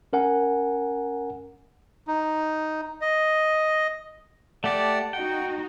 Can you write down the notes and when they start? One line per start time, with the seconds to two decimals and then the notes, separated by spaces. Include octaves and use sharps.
0.13 C#4 A#4 F#5 G#5
2.07 D#4
3.01 D#5
4.64 A3 G4 D5 F#5 A5
5.13 D#4 F#4 F#5 G5